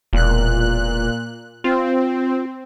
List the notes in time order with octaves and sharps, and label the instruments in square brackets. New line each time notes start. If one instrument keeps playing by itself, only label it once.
[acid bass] E1 [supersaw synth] A#2 F#6
[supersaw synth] C4 [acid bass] F4